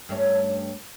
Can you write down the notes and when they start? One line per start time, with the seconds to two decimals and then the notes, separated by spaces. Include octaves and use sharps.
0.09 G2 A3 C#4